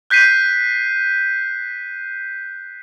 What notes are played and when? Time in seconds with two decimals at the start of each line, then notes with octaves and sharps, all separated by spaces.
0.10 F#6 G6 B6 C7 D#7